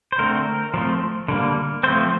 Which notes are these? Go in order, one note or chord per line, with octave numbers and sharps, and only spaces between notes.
C5
D3 A3 C4 A#4
F3 A3 C4
D3 G3 A#3
F3 A3 C4 C5